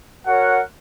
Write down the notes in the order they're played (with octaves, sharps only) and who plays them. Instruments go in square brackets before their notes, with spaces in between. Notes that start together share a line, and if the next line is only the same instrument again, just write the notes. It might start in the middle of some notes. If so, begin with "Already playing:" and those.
[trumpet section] F#4 A#4 C#5 F#5